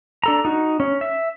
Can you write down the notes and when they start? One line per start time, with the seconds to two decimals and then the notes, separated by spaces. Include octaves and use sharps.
0.24 D4 A4 A#5
0.45 D#4 F#4
0.80 C#4
1.01 E5